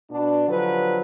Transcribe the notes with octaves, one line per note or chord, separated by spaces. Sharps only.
B2 D4
D3 F3 F#3 G4 B4